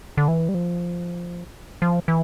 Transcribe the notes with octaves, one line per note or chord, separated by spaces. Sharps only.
D3
E3
G3
F3
F3
E3